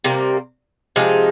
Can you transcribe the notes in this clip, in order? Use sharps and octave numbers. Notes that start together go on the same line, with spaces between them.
C3 G3 A#3
C3 F3 G#3 D#4